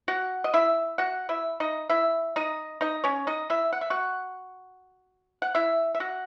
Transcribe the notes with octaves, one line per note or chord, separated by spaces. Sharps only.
F#4 F#5
D#5
E4 E5
F#4 F#5
E4 E5
D#4 D#5
E4 E5
D#4 D#5
D#4 D#5
C#4 C#5
D#4 D#5
E4 E5
F#5
E5
F#4 F#5
F#5
E4 E5
E5
F#4 F#5